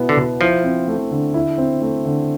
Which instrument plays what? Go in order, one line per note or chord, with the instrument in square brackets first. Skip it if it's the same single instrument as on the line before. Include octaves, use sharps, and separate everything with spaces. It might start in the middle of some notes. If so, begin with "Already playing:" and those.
Already playing: [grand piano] B2 B3 E4
[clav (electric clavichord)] D3
[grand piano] B2
[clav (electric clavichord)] F3 [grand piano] E4
[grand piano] C4
A3
D3
E4
C4
A3
D3